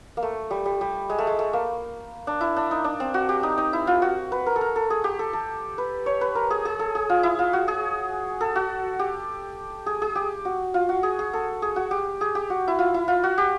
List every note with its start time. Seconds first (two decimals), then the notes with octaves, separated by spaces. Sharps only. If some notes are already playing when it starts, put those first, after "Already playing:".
0.17 A#3
0.23 A3
0.51 G3
0.65 G3
0.81 G3
1.10 G#3
1.18 A3
1.27 G#3
1.39 A3
1.53 A#3
2.27 D4
2.41 E4
2.56 D4
2.71 D#4
2.84 D4
3.00 C4
3.14 F#4
3.29 G4
3.43 D#4
3.58 D#4
3.73 E4
3.87 F4
4.02 F#4
4.32 B4
4.46 A#4
4.56 A4
4.61 A#4
4.76 A4
4.90 G#4
5.04 G4
5.19 A4
5.33 A4
5.78 B4
6.06 C#5
6.21 B4
6.35 A#4
6.50 G#4
6.65 G#4
6.79 A4
6.95 G#4
7.10 F4
7.23 E4
7.39 F4
7.53 F#4
7.68 G#4
8.41 A4
8.56 F#4
8.99 G4
9.86 G#4
10.02 G#4
10.15 G4
10.45 F#4
10.74 F4
10.89 F#4
11.03 G#4
11.19 G#4
11.33 A4
11.62 G#4
11.76 F#4
11.91 G4
12.21 G#4
12.35 G4
12.50 F#4
12.68 E4
12.79 F4
12.94 E4
13.08 F4
13.23 F#4
13.38 G4